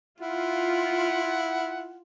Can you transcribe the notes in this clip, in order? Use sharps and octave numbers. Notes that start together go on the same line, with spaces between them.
E4 F4 F#5